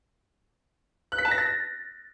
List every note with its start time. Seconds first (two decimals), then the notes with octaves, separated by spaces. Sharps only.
1.12 F#6
1.18 B6
1.25 A5
1.31 A#6
1.38 A6